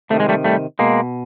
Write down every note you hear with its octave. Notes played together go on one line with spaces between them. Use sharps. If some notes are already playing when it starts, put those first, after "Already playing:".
C3 D#3 A3
G#3
G3 A3
G3 A3
B2 G#3 A#3